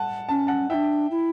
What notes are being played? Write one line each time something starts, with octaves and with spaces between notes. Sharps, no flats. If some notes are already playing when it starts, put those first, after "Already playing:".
Already playing: F#5 A5
C#4 A5
F#5 A5
D4 E4 E5 G5
E4